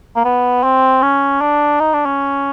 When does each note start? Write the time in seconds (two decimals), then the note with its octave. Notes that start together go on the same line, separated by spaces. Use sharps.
0.16 A#3
0.25 B3
0.64 C4
1.02 C#4
1.41 D4
1.80 D#4
1.94 D4
2.06 C#4